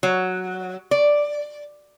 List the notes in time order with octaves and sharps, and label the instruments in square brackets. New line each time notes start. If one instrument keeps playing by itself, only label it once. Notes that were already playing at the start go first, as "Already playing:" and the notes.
[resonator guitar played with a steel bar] F#3
D5